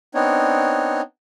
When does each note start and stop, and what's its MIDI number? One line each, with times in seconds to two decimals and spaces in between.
0.15 1.02 59
0.15 1.02 60
0.15 1.02 62
0.15 1.02 63
0.15 1.02 73